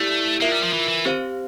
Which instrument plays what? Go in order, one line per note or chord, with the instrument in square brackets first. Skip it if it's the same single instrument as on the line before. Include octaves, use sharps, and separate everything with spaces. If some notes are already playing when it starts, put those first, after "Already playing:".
Already playing: [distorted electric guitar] A3 [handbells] E4 G4 D5
[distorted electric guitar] A#3 [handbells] F4 A#4 E5
[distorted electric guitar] G3
F3
E3
E3
[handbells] C4 G4 C5 F5